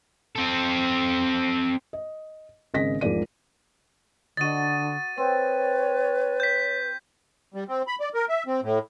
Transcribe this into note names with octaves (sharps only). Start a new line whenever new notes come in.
C4 A4
D#5
G#1 C#3 D#5 A#6 B6
E1 G#2 F3 D5 D#7
D3 F#4 D#5 A6 D#7
C4 B4 C#5
G6 B6
G3
C4
B5
D5
A#4
E5
C4
A2